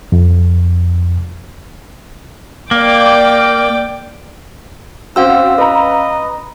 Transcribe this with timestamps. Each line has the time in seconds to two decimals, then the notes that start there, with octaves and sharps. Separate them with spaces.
0.12 F2
2.71 A#3 D5 G5 D6
5.16 C4 C#4 F#4 C5 F5 E6
5.58 B4 D#5 A#5